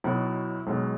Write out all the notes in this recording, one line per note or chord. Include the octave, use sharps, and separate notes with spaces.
B1 B2 F#3 E4
B1 B2 F#3 G#3